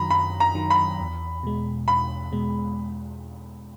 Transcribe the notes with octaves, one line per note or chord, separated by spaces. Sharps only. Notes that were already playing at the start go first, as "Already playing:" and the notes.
Already playing: F#2 D#3 F#3 A#5 B5
F#2 B5
A#5
D#3 F#3
B5
E2
B2 G#3
E2 B5
B2 G#3